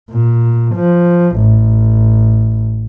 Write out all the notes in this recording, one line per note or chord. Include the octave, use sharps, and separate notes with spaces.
A#2
F3
A1